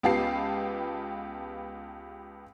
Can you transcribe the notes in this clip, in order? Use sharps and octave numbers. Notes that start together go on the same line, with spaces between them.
C#2 B3 F4 G4 A5 C7